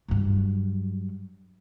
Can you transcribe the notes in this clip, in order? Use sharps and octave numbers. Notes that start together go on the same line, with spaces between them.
G2 F#3